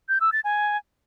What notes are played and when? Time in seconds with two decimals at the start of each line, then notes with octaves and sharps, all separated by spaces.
0.09 G6
0.21 E6
0.33 A6
0.44 G#5